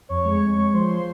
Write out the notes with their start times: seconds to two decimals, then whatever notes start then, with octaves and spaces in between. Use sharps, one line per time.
0.09 F2 C#5 C#6
0.25 G#3
0.42 G#3
0.57 G#3
0.73 F3 C5 C6